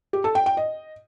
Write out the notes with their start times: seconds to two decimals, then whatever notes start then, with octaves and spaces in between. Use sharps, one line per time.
0.13 G4
0.24 A4
0.35 G5
0.46 G5
0.57 D#5